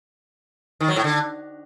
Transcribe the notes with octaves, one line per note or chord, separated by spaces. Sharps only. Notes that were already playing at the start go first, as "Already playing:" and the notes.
D#3
F#3
A2
D3